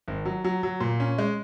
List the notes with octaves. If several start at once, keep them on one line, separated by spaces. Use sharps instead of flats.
G#1
F#3
F#3
F#3
A#2
C#4
G#3